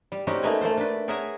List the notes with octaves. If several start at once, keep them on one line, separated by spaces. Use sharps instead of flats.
G3
G3 C4 C#4 D#4 F#4 G4
A3 A#3 D#4 B4 D#5 G#5
A3 A#3 A4 C5
D4 B4
G#4 A#4 C#5 E5 F#5 G#5